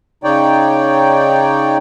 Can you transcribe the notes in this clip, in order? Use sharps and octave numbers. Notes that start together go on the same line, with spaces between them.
C#3 D#4 C#5 D5 G5